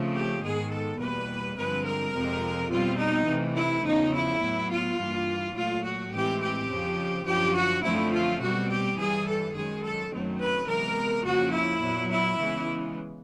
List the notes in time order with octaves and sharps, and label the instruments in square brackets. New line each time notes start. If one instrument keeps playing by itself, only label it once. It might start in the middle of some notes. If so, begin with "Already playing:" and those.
Already playing: [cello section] C#3 F3 A3 C4
G4
G#2 D#3 G#3 B3 G#4
A4
E2 B2 G3 A#3 B4
G2 D3 F3 G#3 C4 B4
A#4
F2 C3 F3 G#3 C4
B2 G3 C4 F4
D#4
C3 E3 A3
E4
E2 C#3 F3 D#4
E4
A2 F#3 B3
F4
G2 E3 G3 A#3
A#2 F#3 A3 F4
F#4
A2 E3 G#3 C4 G4
G4
F2 C#3 F3
F#2 D3 F3 G4
F#4
F#2 D3 F3 A3 C4 E4
F4
B2 G3 C4 F#4
G4
G2 E3 G3 G#4
A4
F#2 D#3 G#3 G#4
A4
F#2 D#3 F#3 A3 C4
B4
C3 E3 G#3 B3 A#4
F2 C#3 F3 A#3 F#4
E4
A#2 F#3 B3
E4
C#3 E3 G#3 B3